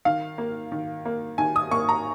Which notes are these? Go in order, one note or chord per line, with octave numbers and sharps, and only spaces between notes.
D#3 F5
A#3
D#3
A#3
D#3 G#5
D#6
A#3 C#6
A#5